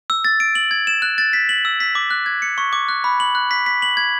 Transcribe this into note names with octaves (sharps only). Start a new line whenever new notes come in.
E6
A6
D7
F#7
G#6
E7
F#6
A6
B6
F#7
E6
B6
D6
F#6
G#6
C#7
C#6
D6
F#6
B5
F#7
F#6
B6
B6
F#7
G#6